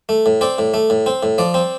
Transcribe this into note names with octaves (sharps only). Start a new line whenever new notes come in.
A3
A2
C4 D5
A2
A3
A2
C4
A2
F3 D5
C4